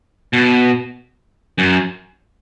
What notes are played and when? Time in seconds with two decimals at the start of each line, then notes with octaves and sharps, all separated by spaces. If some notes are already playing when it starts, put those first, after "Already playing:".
0.33 B2
1.58 F#2